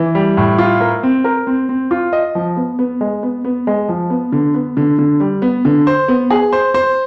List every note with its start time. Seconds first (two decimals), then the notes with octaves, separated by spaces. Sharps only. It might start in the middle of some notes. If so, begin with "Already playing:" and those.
Already playing: E3
0.15 G3
0.37 A2
0.58 F4
0.81 A#4
1.03 C4
1.24 A#4
1.47 C4
1.69 C4
1.91 F4
2.13 D#5
2.35 F3
2.57 B3
2.79 B3
3.01 G#3
3.23 B3
3.45 B3
3.67 G#3
3.89 F3
4.10 B3
4.32 D3
4.54 B3
4.77 D3
4.99 D3
5.20 G3
5.42 B3
5.65 D3
5.87 C5
6.08 B3
6.31 G#4
6.53 C5
6.74 C5